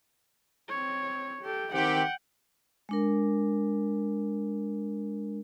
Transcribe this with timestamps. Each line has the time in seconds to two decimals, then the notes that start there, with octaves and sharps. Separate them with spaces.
0.69 C4 C#5
1.42 G4 A4
1.73 D#3 C4 G4 F#5 G5
2.89 G#3 D4 A#4